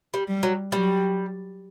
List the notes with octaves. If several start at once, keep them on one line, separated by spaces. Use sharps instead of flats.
G3
G3
F#3
F#3 G3